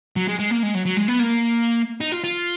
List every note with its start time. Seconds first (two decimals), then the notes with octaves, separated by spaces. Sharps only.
0.16 F#3
0.28 G#3
0.39 G#3
0.51 A#3
0.63 G#3
0.75 F#3
0.86 F#3
0.97 G#3
1.08 B3
1.19 A#3
2.01 D#4
2.12 F4
2.24 F4